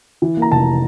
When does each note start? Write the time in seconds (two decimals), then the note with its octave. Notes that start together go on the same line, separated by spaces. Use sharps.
0.22 E3
0.37 A#3
0.42 A#5
0.52 F1 A5